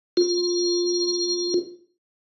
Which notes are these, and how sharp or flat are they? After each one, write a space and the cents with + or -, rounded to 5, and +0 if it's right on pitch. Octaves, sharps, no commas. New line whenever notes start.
F4 +15